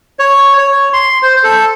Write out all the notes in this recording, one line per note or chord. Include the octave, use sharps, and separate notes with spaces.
C#5
C#5
C6
C5
A4